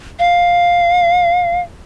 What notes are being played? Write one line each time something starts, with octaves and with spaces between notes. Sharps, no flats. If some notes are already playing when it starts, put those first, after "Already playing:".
F5